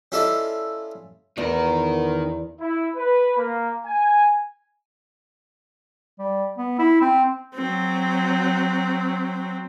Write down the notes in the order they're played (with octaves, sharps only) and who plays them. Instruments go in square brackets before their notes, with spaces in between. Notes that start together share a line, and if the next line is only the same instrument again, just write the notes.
[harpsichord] C#4 E4 F4 A4 D5 D#5
[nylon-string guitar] E2 [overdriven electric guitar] D#3 A#4 [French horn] B3
[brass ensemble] E4
B4
A#3
G#5
[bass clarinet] G3
B3
E4
C4
[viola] F#3 C4